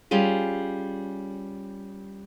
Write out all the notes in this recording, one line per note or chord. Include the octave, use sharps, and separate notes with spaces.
G3 C#4 F4 G#4